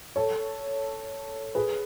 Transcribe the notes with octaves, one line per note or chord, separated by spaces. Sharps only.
A4 C#5
G#4 B4